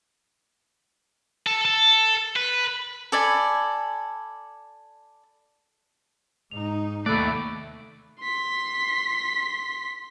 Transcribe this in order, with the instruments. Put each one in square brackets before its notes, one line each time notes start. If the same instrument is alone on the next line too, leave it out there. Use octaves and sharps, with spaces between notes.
[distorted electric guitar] A4
A4
B4
[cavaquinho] A4 D5 G#5 B5
[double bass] G#2 D#4 [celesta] F7
[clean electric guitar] D#2 D5 [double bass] C3 [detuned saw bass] A3 [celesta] B5 E6 F#6
[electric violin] C6 B6